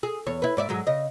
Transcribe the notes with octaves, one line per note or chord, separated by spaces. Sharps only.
G#4
E2 C#5
E4 B4
G#2 D5 E5
G#2 F#3 G#3
C#3 D#5